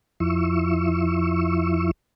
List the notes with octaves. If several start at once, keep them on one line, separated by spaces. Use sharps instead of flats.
F2 F3 E4 C#6 E6